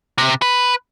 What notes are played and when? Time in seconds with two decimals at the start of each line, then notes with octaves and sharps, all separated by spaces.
0.18 C3
0.42 B4